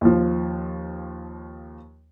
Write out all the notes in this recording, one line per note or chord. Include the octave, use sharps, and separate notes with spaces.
D#2 F3